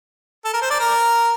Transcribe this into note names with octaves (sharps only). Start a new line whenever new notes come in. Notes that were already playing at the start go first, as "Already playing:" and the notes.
A4
A#4
C5
D5
A#4